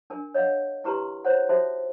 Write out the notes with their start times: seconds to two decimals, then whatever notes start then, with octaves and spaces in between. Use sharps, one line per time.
0.10 D4 A#4 G#5
0.34 C#5 D#5 F5 F#5
0.84 E4 G4 B4 A#5 C6
1.25 C5 C#5 F#5
1.49 D#4 F#4 A4 C5 E5